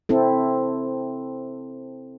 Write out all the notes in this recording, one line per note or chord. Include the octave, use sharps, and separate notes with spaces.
C4 E4 A4